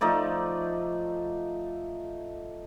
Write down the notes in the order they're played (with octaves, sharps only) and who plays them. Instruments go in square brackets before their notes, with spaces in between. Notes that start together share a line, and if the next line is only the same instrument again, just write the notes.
[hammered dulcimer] F3 A3 D#4 D5